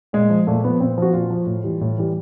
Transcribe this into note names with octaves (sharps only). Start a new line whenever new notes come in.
A#2 G#3
F3
A#2 A3
F3 B3
A#2 C4
F3 F#4
A#2 F4
F3
A2
E3 G3
A2
E3 G3